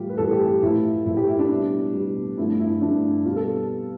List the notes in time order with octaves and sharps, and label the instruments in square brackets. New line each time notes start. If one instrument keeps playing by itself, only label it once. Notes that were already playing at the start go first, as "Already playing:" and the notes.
Already playing: [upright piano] A2 E3 G3 F4 G4
B4
A2 E3 G3 A4
G4
G4
A2 F3 A3 E4
A2 F3 A3 E4
G4
E4
D4
B2 G3
B2 G3
G2 D3 F3 A3 E4
E4
G2 D3 F3 A3 D4
B2 G3 F4
A4